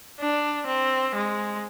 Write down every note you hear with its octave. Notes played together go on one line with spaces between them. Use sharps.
D4
C4
G#3